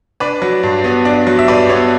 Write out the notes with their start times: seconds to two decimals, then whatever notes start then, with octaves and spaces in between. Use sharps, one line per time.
0.20 D4 B4 D5
0.42 F#3
0.63 G2
0.84 B3
1.05 D4
1.27 F#3
1.39 E5
1.48 G2 B4 D5
1.69 B3 C#5